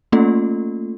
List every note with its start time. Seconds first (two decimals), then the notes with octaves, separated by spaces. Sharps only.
0.12 A3 A#3 C#4 F4 A4